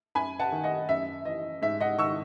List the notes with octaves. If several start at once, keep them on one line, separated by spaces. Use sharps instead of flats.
F#2 G#5 B5
F#5 A5
D#3
D#5 F#5
F#2 E5
E3 D#5
G#2 E5
D#5 F#5
D#3 C#6 E6